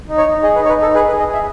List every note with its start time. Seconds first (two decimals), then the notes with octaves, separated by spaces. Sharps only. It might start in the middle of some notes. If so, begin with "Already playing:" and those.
0.09 D#4
0.18 C#5
0.27 D#4
0.43 G#4 D#5
0.56 B4
0.60 D#4 C#5
0.69 B4
0.77 D#4
0.82 A4
0.94 G#4 B4
1.08 B4
1.11 G#4
1.19 D#5
1.28 G#4 E5